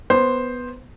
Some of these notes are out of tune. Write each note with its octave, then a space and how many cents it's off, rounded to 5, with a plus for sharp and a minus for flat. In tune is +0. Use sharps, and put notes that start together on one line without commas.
B3 +0 C5 +0